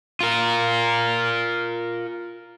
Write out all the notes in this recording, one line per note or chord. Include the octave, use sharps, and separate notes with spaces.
F4 A#4